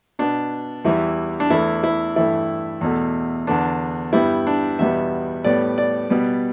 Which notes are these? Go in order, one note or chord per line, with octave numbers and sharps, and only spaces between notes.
B2 B3 D4
E2 E3 G3 E4
D4
E2 E3 A3 E4
E4
G2 E3 A3 E4
E2 B2 A3
E2 D3 B3 D4
G2 G3 B3 E4
D4
E2 B2 G3 B3 E5
A2 G3 B3 D5
D5
B2 G3 B3